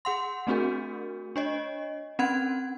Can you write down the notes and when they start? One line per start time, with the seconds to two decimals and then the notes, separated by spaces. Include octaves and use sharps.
0.05 G#4 F#5 C6
0.47 A3 C4 D4 F#4 G#4 A#4
1.36 D4 C#5 D#5
2.19 C4 C#4 F#5 G#6